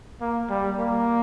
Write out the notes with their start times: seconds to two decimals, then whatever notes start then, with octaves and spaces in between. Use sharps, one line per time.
0.21 A#3
0.50 G3
0.79 A#3